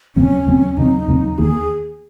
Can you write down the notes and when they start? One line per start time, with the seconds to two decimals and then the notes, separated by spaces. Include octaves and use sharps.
0.16 D#2 C#3 F#3 C4 C#4
0.46 D#2 C#3 F#3 C4
0.77 D#2 C#3 F#3 C4 D#4
1.07 D#2 C#3 F#3 C4
1.38 D#2 D#3 A#3 G#4